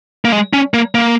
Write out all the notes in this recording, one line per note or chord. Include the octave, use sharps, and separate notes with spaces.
A#3
G#3
C#4
A#3
A#3